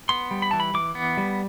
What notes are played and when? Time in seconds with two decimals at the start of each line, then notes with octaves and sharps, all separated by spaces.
0.09 B3 C6
0.31 G3
0.42 B5
0.51 E3 A5
0.60 B5
0.74 E3 D6
0.95 B3
1.17 G3